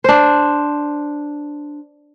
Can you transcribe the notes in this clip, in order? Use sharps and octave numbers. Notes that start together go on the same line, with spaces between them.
D4 C5